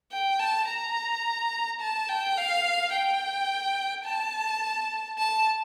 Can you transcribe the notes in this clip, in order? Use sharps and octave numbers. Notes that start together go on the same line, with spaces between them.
G5
A5
A#5
A5
G5
F5
G5
A5
A5